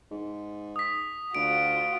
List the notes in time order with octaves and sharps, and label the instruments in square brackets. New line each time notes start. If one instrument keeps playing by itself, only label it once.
[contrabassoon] G#2
[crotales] D#6 B6
[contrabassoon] D2 [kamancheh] F4 F#4 [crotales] D7